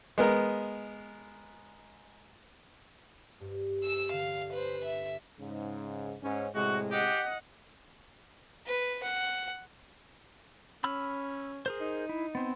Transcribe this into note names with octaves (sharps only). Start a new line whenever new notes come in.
G#3 B3 A#4
G2
E6 E7
D3 F5
B4 C5
E5
G#2 C#3
G#2 C#4
A2 C3 G#3 F#4
G4 D#5 F#5
B4
F#5
C#4 B5 E6 F6
G#4 A#4 C5
D#4
E4
B3 C4